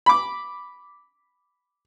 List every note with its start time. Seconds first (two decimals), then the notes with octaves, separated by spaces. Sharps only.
0.06 B5 D6